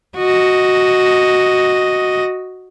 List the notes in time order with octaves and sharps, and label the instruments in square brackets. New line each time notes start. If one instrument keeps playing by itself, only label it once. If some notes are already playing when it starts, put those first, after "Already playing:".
[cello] F#4 D#5